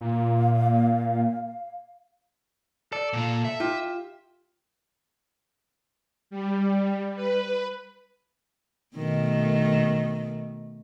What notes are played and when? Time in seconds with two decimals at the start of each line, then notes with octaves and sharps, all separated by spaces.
0.01 A#2 F5
2.93 A4 D5
3.13 A#2 F4
3.45 E5
3.60 F4 G4
6.30 G3
7.16 B4
8.96 B2 D#3 A3